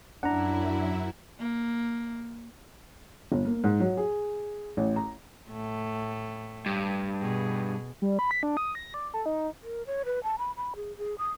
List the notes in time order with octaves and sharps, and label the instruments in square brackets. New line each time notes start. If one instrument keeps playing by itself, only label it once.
[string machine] F#2 E4 [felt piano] D4 [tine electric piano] F#5 A#5
[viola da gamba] A#3
[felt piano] G1
A#3
G#2
F#3
G#4
A1
A#5
[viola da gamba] A2 A3
[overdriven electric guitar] G2
[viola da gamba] B2 G#4
[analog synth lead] G3
B5
B6
D4
D#6
A#6
D5
A4
D#4
[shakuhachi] A#4
C#5
B4
A5
B5
B5
G#4
G#4
D#6